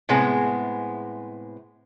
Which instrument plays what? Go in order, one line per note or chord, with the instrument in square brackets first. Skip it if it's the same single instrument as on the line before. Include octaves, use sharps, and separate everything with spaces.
[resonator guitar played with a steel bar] A2 C3 G#3 B3 G#4